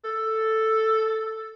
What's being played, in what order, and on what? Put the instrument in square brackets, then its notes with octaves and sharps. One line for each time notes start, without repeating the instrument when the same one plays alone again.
[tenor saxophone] A4